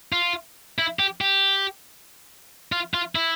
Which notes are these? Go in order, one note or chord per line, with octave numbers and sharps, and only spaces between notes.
F4
E4
G4
G4
F4
F4
E4